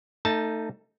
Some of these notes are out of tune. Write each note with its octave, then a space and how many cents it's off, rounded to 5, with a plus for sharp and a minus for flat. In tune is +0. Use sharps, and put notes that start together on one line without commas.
A3 +25 D#4 +0 A5 +0